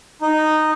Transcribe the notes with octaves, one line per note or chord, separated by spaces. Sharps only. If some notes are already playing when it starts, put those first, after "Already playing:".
D#4